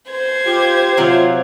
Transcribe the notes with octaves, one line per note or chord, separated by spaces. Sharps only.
C5 G#6
F4 G4
C3 F#3 F4